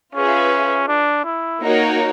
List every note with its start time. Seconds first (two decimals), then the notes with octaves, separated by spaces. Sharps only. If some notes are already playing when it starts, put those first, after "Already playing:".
0.14 C#4 F4 G#4 B4 E5
0.88 D4
1.25 E4
1.61 A#3 D#4 F#4 A#4 C#5